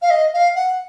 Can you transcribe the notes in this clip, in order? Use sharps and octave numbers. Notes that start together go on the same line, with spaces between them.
F5
D#5
F5
F#5